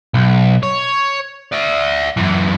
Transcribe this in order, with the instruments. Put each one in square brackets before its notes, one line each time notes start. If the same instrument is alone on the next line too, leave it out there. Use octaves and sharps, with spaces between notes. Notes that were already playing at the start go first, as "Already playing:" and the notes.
[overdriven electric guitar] B1
C#5
D5 E5
F#2 E3